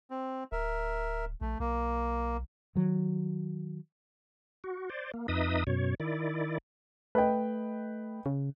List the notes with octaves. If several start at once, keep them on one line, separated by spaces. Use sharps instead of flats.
C4
D1 A#4 E5
A#1 A3
B1 A#3
D#3 F#3
F#4
C5 D5
A#3
F2 D#4 B4 D#5 E5 D#6
F#2 B2 C#5
D#3 E4 D5
A3 B4 D#5 G5
C#3